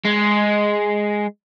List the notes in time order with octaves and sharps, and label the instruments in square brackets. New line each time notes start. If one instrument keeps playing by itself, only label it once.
[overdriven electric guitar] G#3